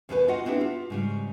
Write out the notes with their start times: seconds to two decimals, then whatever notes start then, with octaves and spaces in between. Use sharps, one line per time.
0.09 D#2 B2 C4 D#4 B4 G#5
0.28 F4 F#4 D#5 F#5
0.45 B3 C4 D4 E4 G4
0.61 F4
0.90 G#2 C#3 G3